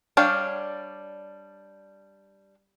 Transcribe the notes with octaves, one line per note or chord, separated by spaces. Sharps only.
G3 D4 C#5 F5 G5